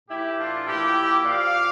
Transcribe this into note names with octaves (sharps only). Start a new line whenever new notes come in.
A2 E3 E4 G4
D4 F4
A#2 F3 E4 G4
A#2 F3 D5 F5